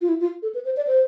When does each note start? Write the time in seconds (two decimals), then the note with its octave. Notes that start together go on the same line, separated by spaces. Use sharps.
0.01 F4
0.09 E4
0.20 F4
0.42 A4
0.54 B4
0.65 C5
0.77 D5
0.87 C5